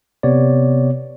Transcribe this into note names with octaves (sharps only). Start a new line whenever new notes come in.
C3 B3 C#5 D5